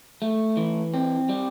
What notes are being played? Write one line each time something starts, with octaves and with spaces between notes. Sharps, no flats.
A3
E3
C4
G3